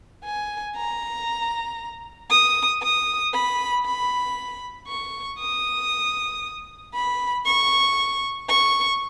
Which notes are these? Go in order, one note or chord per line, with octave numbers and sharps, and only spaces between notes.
G#5
A#5
D#6
D#6
B5
B5
C#6
D#6
B5
C#6
C#6